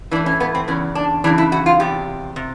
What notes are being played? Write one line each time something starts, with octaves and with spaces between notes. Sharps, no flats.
A2 E3 D4
C#4
B3
C4
E2 C#3 C#4
D4
F#2 C#3 E3 D4
E4
F#4
F4
E2 C3 G4
C3